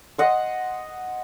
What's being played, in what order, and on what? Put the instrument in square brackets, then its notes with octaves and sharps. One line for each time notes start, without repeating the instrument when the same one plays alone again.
[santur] D#5 F#5 C6